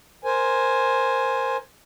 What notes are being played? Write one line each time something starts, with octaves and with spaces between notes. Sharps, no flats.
A#4 C5 G#5